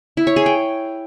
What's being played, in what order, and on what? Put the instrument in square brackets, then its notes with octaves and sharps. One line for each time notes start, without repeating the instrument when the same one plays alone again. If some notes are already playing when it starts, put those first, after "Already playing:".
[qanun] E4
C#5
G#4
G5